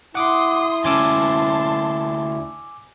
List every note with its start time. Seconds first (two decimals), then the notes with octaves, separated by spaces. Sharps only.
0.15 E4 F#5 C6 D6 D#6
0.85 D2 C#4 G#5 A5 C6 D6 E6